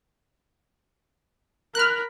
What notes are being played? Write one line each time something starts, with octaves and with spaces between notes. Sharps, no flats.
A#4 B5 F6 F#6